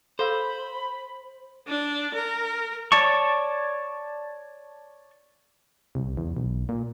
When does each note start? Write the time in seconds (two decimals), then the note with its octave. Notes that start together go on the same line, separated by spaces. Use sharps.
0.19 A4 C5 F5 B5 E6
1.68 D4
2.15 A#4
2.92 C#5 D5 A5 C#6
5.95 C2
6.17 E2
6.37 B1
6.69 A#2